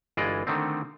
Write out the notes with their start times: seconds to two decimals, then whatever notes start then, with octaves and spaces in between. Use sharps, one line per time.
0.17 G1 E3 G#3 F4 D5 D#5
0.47 D3 D#3 A3 C4